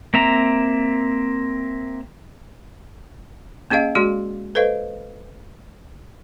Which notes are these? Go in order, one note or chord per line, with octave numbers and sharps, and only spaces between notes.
A#3 C4 E5 A#5
A#3 C#4 G#4 D#5 F5
G#3 F#4 G#4 D5 C6
A4 B4 C5 D#5 F5